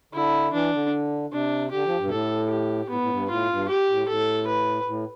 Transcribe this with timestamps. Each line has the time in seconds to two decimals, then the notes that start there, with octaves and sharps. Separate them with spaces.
0.13 D3 E4
0.53 E3 D4
0.73 D3
1.32 C3 D4
1.71 D3 G4
1.85 F3
1.98 G2
2.05 B2
2.10 A2 A4
2.50 G4
2.90 A2 B3
3.01 A2
3.10 G2
3.29 A2 F4
3.49 G2
3.69 G4
3.88 A2
4.08 A2 A4
4.47 B4
4.87 A2